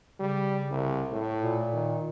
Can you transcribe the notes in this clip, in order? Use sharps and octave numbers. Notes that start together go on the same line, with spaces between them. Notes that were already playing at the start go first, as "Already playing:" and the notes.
C#3 G3
C2
A2
A#2
D#3